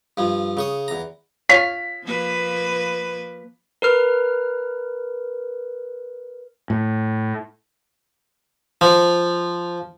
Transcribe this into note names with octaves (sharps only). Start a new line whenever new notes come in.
G2 F3
C#3 C#6 D#6
E2 A#5
F4 C#5 F5 B6
F3 A#3 B4
A#4 B4 F6
A2
F3